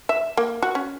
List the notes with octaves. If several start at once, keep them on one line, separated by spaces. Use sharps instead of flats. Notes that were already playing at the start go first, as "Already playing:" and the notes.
E5
A#3
F#4
C#4